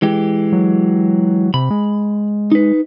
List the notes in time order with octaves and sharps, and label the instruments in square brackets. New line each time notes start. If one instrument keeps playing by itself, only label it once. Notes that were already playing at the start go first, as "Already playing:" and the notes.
[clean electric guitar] E3 G#3 G4
[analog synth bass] F#3
[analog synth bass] C3 [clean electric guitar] B5
[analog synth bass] G#3
[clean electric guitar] D#4 B4